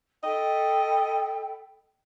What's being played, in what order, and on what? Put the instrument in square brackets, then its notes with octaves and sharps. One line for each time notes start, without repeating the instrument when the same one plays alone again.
[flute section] A4 G5 B5 [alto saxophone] D#5